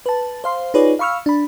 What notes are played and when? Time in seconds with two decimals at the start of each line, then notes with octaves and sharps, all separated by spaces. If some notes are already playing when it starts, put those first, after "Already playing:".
0.06 B4 A5
0.44 C5 F5 C6
0.74 D#4 F4 G#4 B4 C#5 D5
0.99 F5 B5 C#6 E6 F6
1.26 D4 B5